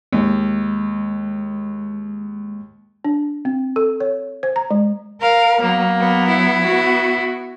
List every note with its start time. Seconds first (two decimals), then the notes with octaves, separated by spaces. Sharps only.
0.13 D#2 G#3
3.05 D4
3.45 C4
3.76 A4
4.00 C#5
4.43 C5
4.56 A#5
4.71 G#3
5.21 A#4 F5
5.62 F#3 A#3 B3
5.98 F#3 B3
6.27 E4
6.67 B3 F#4